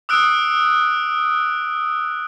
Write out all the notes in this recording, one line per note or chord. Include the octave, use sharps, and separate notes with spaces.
D#6 E6 F#6 D7